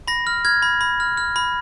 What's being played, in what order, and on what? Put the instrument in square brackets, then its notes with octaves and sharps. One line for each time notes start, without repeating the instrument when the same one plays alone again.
[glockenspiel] B5 A#6
F6
F6 G#6
B5
B5
F6
F6
B5